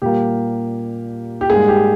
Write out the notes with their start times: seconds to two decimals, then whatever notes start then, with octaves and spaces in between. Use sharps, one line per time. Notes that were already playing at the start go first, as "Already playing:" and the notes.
0.02 A#2 G3 A#3 G4
1.41 G4
1.50 G#2 G3 A#3 G#4
1.68 G4